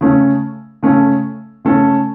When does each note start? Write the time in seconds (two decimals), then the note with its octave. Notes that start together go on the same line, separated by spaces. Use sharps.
0.01 C#3 A3 C#4 A4
0.83 C#3 A3 C#4 A4
1.65 C#3 A3 C#4 A4